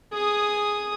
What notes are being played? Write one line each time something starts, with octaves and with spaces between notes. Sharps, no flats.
G#4 D#6